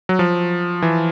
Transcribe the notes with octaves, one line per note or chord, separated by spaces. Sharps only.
F#3
F3
E3